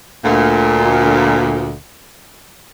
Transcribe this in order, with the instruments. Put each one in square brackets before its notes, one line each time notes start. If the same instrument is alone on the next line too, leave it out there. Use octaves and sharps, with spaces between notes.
[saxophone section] D2 A#2